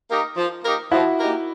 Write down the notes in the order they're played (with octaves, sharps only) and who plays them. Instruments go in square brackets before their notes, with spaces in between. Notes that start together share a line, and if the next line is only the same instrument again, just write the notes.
[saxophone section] A#3 D#4 G4 A#4
F3
A#3 D#4 G4 A#4
[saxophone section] F3 [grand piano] E4 F#4
[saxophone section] A#3 D#4 G4 A#4